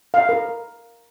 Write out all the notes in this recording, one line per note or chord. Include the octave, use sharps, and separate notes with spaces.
F5
A#4